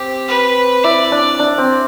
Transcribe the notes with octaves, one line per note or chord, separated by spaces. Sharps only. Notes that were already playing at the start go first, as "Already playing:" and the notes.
Already playing: C4 G4
B4
E4 D5
D4
D4
C4